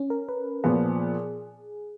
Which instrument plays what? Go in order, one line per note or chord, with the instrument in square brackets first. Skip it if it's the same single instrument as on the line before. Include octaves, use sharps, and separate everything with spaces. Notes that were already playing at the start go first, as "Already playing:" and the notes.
Already playing: [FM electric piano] C#4
A#4
B4
[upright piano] A#2 F3 B3 [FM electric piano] G#4